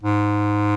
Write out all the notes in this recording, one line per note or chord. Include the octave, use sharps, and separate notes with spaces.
G#2